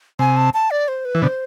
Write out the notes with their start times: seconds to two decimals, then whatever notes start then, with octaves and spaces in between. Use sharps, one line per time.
0.19 C3 G#5
0.37 A5
0.54 A5
0.71 D5
0.88 C5
1.05 B4
1.15 E3
1.22 B2 D3 C5